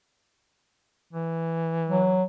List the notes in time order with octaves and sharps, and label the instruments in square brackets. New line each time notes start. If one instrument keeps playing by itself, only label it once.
[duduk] E3
[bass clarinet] F#3